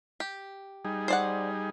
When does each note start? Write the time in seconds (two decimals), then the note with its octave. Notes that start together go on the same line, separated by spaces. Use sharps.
0.20 G4
0.85 G3 D#4 G#4
1.08 C5 D5 F#5